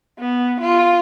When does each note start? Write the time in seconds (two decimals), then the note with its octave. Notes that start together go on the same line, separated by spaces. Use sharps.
0.19 B3
0.61 F4